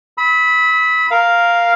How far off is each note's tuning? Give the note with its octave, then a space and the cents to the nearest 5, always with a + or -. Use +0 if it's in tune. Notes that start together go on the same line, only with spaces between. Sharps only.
B5 +0 E6 -45
A#4 +0 F5 +0